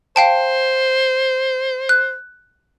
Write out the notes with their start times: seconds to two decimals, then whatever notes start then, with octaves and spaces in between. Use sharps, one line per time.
0.16 C5 F5 G5 A5
1.89 F#6